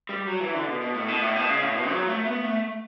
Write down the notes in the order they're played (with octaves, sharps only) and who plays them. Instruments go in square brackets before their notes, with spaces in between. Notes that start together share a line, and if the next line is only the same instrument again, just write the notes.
[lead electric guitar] G3
F#3
E3
D3
B2
B2
A2
B2
A2
B2
C#3
A2
B2
F#3
A3
B3
A3